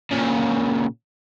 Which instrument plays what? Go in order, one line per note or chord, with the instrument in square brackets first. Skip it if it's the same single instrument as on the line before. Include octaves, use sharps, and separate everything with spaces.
[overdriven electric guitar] A#2 C#3